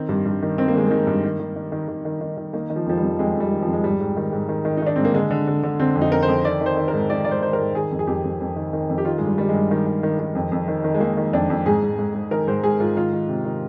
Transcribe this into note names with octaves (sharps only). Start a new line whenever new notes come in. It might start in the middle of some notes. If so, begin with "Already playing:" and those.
Already playing: D#3 C4
G2
G2
D#3
D#3 C4
A#3
D#3 G#3
D#3 A#3
G2
D#3
D#3
D#3
D#3
D#3
D#3
D#3
D#3
D#3 A#3
D#3
F3
F2 F3
G3
F2
F2 G#3
F2
G3
D#3
F2 F3
G#3
G#2 G3
G#2
D#3
G#2
D#3
D#3
D#4
D#3 D4
G#2 C4
A#3
D3 G#3
D3
D3
D3
D3 C4
F2
D#4
F2 A#4
C5
F2
D#3 D5
D#3
C5
D#3
A#4
G#2
D#3 D5
G#2 D5
C5
D#3 C5
A#4
G#2
D#3 G#4
F2
G#4
F2 G4
F2
F2
D#3
D#3
F2
G4
D#3 F4
G2 G#3
G3
D#3 G3
G#3
G2
D#3
D#3
D#3
D#3
F2
F2
D#3
D#3
G#3
D#3 A#3
D#3
F2 D4
F2
G#2 G#4
G#2
G#2
G#2
D#3 A#4
G#2 C5
G#2 G#4
G#2 F4
D#3 F4
D#3
C3
D#3